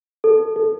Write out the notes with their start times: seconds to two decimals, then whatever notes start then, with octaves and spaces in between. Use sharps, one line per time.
0.24 A4
0.56 A4